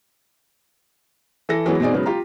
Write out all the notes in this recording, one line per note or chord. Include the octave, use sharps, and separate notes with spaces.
E3 A4 A#6
E3 F#3 G#3 B3
B2 C4 D#4 G#4 D5
C#3 F#3 G#3 B3
F4 G4 A#5